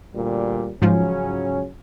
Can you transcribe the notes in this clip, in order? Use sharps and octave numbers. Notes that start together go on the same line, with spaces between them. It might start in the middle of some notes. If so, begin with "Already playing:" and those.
D2 A#2 G3
G#2 C#3 F3 F#3 C#4 F4